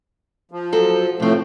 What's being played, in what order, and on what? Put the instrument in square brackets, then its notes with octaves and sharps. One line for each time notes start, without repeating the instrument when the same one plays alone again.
[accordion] F3
[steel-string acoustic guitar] F#3 A4
[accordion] A2 F3 A3 [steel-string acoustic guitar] C3 C4